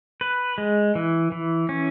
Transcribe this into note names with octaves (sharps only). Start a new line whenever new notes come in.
B4
G#3
E3
E3
C#4